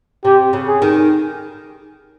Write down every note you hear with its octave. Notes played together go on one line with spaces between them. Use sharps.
C3 G4
C#3
G#4
D#3